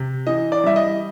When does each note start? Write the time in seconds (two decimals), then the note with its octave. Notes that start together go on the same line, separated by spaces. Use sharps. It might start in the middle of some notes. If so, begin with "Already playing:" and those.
Already playing: C3
0.27 E3 D#5
0.52 D5
0.64 G3 E5
0.76 D#5